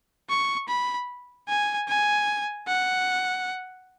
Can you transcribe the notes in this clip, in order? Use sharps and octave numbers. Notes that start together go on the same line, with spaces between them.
C#6
B5
G#5
G#5
F#5